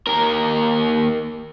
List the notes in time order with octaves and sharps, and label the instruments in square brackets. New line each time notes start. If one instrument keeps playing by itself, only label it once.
[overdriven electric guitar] D#2 A#4